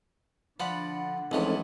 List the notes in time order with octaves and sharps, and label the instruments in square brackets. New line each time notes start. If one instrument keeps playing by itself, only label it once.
[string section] D3 [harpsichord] F3 [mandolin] D5 F#5 B5
[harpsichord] C#2 E3 F3 [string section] A3 C#4 [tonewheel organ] C4 D#4 A4